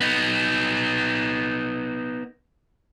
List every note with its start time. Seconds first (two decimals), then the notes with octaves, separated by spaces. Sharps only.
0.01 B3 D#4